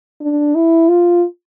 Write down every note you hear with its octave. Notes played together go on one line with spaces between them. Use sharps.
D4
E4
F4